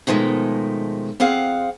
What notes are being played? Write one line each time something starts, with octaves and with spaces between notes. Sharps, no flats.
B2 D#3 F3 G#3 A3
F2 C4 G#4 F5 F#5